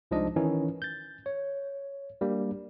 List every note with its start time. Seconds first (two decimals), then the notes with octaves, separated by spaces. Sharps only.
0.11 C2 F3 G#3 D4 D#4 D#5
0.36 D#3 E3 C#4 D#4 E4
0.82 G6 A6
1.26 C#5
2.21 G3 A#3 D4